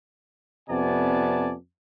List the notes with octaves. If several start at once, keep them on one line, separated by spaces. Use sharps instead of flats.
F2 C3 B3 D5 G#5 A5